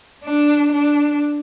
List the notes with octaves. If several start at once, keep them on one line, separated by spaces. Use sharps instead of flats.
D4
D4